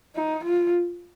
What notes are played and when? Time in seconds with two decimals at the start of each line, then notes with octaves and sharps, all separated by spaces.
0.16 D#4
0.45 F4